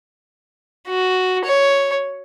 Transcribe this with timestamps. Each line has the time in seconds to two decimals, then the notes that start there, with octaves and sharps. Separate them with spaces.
0.88 F#4
1.44 C#5